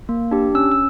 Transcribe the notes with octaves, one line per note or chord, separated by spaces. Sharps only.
A#3
D4 G4
C#4 E6
E6